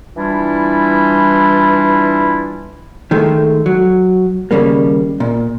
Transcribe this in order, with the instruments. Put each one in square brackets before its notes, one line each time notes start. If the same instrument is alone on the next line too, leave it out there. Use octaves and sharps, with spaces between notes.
[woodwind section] E3 G3 D4 E4 F4
[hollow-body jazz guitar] D#3 G#3 A3
F#3
D#2 A2 C#3 G3 A#3
A#2